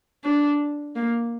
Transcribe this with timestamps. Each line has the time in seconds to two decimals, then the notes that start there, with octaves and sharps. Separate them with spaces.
0.24 D4
0.95 A#3